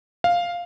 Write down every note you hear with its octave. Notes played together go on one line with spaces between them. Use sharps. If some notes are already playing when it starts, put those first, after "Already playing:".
F5